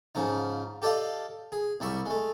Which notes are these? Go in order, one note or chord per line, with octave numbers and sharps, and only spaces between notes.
G#2 C#3 F3 D#4
G4 A4 D5 D#5 F5
G#4
C2 G3 E5 C#6
G#3 A3